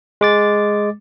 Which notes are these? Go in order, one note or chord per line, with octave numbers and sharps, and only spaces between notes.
G#3 D6 A6